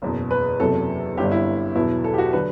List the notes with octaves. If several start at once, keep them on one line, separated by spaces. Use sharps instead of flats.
F#1 E2 B2
B4
F#1 E2 C3 F#3 A4
G1 G2 D3 G3 G4
E4
E2 B2 F#3 E4
A4
G4
F#4
D3 F#3 B4